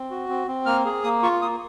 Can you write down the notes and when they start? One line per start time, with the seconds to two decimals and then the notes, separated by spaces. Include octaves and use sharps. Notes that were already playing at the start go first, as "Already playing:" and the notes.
Already playing: C4
0.10 F#4
0.29 C4
0.48 C4
0.66 A#3 F6
0.85 G#4
1.04 A#3 D#6
1.23 F4 C#6
1.42 A#3 D#6